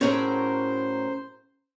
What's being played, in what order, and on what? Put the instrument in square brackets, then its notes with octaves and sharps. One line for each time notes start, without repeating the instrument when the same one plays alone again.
[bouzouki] A2 F#3 A#4 [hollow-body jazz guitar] C#4 G#4 E5 [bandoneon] C5